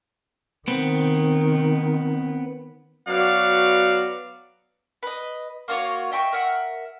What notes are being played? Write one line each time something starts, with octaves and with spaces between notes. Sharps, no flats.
D#3 B3 C4
F#3 B3 F#4 D5 F5
B4 D#5
A#3 F4 F#4 C#5
D#5 E5 G5 C#6
A#4 E5 F#5